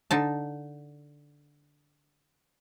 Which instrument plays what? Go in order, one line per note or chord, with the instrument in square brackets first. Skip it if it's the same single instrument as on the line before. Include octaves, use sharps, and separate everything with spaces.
[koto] D3 D#4 A5